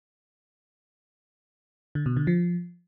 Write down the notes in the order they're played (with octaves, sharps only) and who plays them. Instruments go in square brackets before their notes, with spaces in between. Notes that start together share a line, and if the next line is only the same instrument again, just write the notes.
[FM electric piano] D3
B2
D3
F3